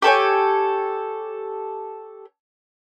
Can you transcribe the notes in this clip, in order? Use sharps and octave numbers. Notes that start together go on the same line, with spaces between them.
G4 A4 C#5 G#5